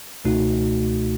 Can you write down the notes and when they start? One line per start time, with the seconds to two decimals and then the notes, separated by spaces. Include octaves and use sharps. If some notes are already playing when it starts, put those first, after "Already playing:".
0.25 C#2 B2 A3 D#4 F#4